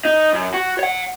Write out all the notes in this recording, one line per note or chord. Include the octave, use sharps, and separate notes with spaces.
D#4
F#2
F#4
C#5 F#5